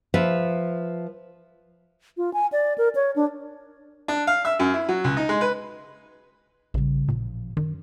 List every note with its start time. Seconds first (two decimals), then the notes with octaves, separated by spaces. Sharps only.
0.14 F3 B4 E5
2.17 F4
2.34 G#5
2.52 D5
2.78 A#4
2.95 C#5
3.16 D4
4.08 D4
4.27 F5
4.45 E5
4.59 F#2
4.74 E4
4.88 F#3
5.04 C#2
5.17 D#4
5.29 G#3
5.41 B4
6.74 A#1 C#3 G3
7.08 A1 A#2 F3
7.57 F#2 D#3